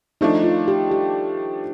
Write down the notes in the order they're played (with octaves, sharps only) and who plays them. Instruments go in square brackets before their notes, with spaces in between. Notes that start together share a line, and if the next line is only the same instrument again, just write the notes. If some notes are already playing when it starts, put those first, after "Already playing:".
[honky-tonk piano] F3 A3 D4 [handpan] D#4
[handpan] F4
G4
G4